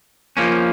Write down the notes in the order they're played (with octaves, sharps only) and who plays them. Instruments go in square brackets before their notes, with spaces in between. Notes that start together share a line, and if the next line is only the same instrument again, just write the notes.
[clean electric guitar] F3 A#3 C#4